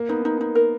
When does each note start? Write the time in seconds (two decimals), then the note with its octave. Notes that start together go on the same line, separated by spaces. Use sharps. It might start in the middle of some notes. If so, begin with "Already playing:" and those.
Already playing: A#3
0.09 B3 D#4
0.25 D#4
0.41 D#4
0.55 A#4